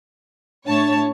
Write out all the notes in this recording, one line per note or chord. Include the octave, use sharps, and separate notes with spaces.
A2 D4 C#5 A5